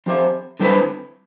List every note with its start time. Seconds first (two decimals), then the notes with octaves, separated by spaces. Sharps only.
0.06 F3 C4 G4 C5 E5
0.60 D3 G3 C4 E4 B4